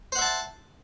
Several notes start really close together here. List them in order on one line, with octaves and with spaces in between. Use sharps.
C5 F#5 E5 A5